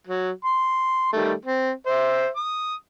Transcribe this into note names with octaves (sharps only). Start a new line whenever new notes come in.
F#3
C6
D#3 G3 A3
C4
C5 E5
D#6